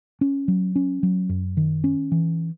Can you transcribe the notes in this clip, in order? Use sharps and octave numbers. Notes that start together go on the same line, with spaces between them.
C#4
F#3
C#4
F#3
F#2
D#3
C#4
E3